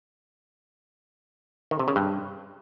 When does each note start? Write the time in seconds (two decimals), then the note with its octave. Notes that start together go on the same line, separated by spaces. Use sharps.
1.71 D#3
1.79 C3
1.88 C#3
1.96 G2